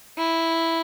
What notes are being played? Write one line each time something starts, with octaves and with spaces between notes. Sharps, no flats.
E4